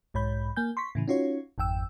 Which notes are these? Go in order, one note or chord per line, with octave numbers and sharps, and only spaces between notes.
B1 G#2 C#5 B5 G6
A#3 G#5 G6
C6 C#6 B6
A2 C#3 E3
C#4 D#4 F4 F#4 C#5
G#1 F2 G5 E6